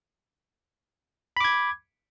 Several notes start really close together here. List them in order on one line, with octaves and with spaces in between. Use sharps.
B5 D6 G#6